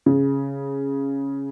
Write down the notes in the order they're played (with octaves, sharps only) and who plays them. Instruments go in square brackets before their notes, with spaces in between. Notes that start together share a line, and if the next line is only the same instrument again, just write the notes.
[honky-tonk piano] C#3